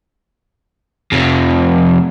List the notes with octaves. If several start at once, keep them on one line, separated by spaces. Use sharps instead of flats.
F2 C3